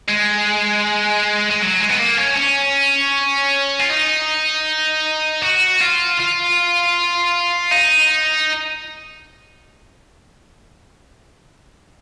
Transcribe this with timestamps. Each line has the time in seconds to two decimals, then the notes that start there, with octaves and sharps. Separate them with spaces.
0.08 G#3
1.50 G#3
1.61 F#3
1.80 G#3
1.90 B3
1.99 A#3
2.18 C#4
2.37 C#4
3.80 F4
3.90 D#4
5.42 F#4
5.80 F4
6.19 F4
7.71 D#4